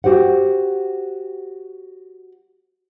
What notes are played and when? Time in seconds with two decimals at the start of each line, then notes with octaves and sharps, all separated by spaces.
0.04 F#4 G4 C5 F#5